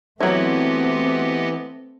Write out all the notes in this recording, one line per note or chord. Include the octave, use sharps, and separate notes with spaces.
E3 F#3 A3 B3 C4 E4 G4 D#5